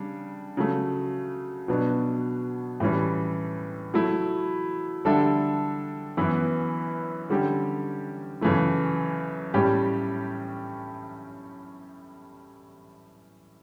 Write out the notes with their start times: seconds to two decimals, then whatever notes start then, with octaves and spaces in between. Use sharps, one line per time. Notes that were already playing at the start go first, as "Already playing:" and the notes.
Already playing: C#3 G3 D4
0.57 C#3 F#3 A3
1.68 B2 F#3 B3 D4
2.80 A2 E3 G3 C#4
3.94 F#3 A3 E4
5.05 D3 G3 D4 A4 E5
6.17 F#2 E3 B3 E4
7.30 D3 G3 C#4 G4
8.41 F#2 C#3 E3 A3 E4
9.54 A2 G3 C#4 G4